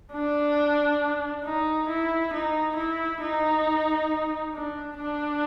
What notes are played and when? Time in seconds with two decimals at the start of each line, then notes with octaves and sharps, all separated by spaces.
0.13 D4
1.45 D#4
1.89 E4
2.33 D#4
2.77 E4
3.22 D#4
4.54 D4
4.97 D4